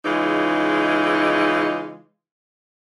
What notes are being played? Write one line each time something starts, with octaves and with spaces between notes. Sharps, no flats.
C#3 E3 G#3 D#4 F4